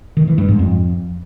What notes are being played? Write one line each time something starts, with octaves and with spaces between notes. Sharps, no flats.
D#3
E3
G2
G#2
F2